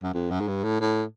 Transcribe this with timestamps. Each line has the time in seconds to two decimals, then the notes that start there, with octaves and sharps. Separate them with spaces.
0.03 F#2
0.14 F2
0.31 F#2
0.40 G#2
0.48 G2
0.64 A2
0.81 A2